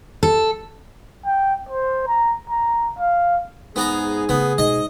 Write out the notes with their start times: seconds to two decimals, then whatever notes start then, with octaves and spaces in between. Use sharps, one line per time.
0.23 A4
1.25 G5
1.69 C5
2.07 A#5
2.50 A#5
2.99 F5
3.76 G#2 B3 G#4 A#5
4.29 C#3 A3 B3
4.58 G#2 B2 D#5